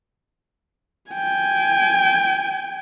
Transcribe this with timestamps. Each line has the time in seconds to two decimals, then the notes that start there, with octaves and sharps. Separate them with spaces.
1.11 G5 G#5